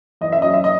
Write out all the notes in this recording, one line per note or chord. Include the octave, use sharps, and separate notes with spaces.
E2 D#5
E5
F#3 D#5
E5
D#5